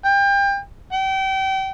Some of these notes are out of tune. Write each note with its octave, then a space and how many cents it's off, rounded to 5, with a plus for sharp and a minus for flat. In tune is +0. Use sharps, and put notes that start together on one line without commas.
G5 +30
G5 -30